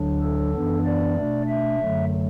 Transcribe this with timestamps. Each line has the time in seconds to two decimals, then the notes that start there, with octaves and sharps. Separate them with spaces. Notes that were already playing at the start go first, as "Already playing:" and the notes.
Already playing: D2 D3 F#3 D4
0.22 A4
0.54 F#2 E3 B3 D4
0.86 D5
1.16 B2 A3 D4
1.48 E5
1.80 F#2 D3 F#3 A3